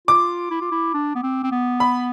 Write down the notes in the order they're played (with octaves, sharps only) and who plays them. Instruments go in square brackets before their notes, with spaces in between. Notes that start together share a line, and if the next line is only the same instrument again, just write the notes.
[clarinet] F4 [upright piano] D6
[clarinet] E4
F4
E4
D4
B3
C4
C4
B3
[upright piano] B5